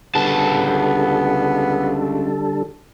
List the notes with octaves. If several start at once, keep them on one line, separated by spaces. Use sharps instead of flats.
C#2 D3 G3 B3 A4 A5